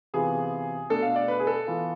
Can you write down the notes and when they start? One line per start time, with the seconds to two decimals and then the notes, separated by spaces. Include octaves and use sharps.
0.14 C3 E3 B3 F4 G#4
0.90 B2 A3 D4 A4
1.02 F5
1.16 D5
1.28 B4
1.40 G#4
1.47 A4
1.67 E3 B3 F4